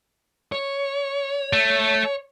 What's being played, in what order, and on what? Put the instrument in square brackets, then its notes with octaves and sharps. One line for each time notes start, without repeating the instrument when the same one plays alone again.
[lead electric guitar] C#5
[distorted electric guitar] A3